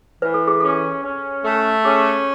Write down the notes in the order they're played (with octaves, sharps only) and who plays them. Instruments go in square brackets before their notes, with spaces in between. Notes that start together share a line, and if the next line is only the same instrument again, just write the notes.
[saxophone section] E3 [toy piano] B4
[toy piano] A4
G#4
[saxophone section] C#4 [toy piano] A4
[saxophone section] C#4
A3
[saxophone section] C#4 [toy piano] G#4